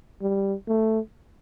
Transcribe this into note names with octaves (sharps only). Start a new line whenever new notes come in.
G3
A3